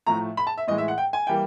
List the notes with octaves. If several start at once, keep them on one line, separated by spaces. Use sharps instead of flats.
A2 F3 A3 A#5
B5
A5
E5
A2 E3 G#3 D#5
E5
F#5
G5
G#5
E3 G3 A#3 G5